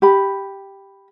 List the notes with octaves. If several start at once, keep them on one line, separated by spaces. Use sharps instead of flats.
G4 B5